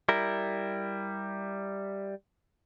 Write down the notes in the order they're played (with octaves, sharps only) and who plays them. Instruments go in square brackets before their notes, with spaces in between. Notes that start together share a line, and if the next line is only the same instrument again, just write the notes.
[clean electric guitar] G3 E4 A#4